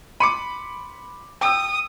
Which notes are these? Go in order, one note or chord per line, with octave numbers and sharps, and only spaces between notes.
B5 C6 D6 C#7 D#7
G5 D#6 E6